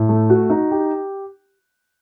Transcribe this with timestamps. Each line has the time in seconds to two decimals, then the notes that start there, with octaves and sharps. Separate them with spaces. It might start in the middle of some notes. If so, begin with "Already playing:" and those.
Already playing: A2
0.09 A3
0.30 F#4
0.50 D#4
0.71 G4